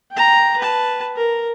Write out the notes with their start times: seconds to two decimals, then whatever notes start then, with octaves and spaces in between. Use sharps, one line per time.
0.12 G5 A#5
0.58 B4 A5
1.16 A#4